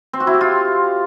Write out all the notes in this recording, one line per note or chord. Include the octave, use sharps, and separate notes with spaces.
C4
F#4
E4
G4
F4